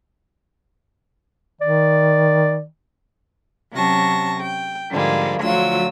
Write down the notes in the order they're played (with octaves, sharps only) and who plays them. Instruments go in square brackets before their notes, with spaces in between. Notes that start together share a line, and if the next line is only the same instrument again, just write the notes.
[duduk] D#3 [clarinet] D5
[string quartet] C3 F#3 C#4 A5 C#6 A#6
G5
G#2 D3 F3 G3 G#3 A#3
D2 F3 F#3 F4 E6